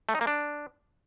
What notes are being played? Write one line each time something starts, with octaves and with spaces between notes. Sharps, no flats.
A3
D#4
A#3
D4